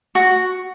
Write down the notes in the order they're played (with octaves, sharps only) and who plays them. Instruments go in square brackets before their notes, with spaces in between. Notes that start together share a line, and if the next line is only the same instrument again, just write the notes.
[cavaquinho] F#4